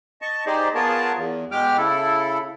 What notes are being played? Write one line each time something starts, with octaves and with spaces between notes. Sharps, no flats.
D#5 A5 C#6
D#4 G4 G#4 C5 D5 D#5
B3 F4 G#4 A#4 C#5 A5
E2
B2 G#3 G4 G5 D6 F6
C#3 E4 A4